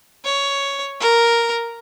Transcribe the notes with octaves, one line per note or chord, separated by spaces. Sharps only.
C#5
A#4